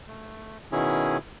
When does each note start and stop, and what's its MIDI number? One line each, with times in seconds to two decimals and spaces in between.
0.08 0.58 57
0.72 1.18 47
0.72 1.18 51
0.72 1.18 61
0.72 1.18 64
0.72 1.18 68